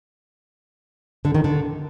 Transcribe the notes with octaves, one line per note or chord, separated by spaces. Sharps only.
D3
D#3
D3